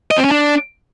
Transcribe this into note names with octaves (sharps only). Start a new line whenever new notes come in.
D#5
C4
C#4
D4